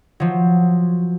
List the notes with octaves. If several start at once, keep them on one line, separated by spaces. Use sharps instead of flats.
F3 F#3